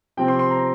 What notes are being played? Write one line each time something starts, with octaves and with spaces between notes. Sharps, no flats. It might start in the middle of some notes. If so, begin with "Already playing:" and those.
C3 F3 C4 G5
C6
C6
A#5